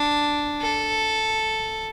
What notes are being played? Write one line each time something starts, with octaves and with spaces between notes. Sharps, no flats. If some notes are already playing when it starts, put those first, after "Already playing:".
Already playing: D4
A4